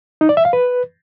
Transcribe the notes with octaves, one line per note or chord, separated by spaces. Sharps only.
D#4
D5
E5
F5
B4